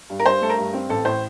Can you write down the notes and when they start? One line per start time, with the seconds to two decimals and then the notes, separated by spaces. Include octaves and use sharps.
0.10 G2
0.20 A#4
0.26 G2 C5
0.41 A3 A4
0.50 A#4
0.58 G2
0.73 C4
0.89 A1 A4
1.05 A2 C5